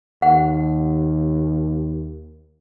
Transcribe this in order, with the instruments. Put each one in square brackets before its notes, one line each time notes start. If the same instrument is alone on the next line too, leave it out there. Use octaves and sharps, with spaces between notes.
[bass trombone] D#2 [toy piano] F#5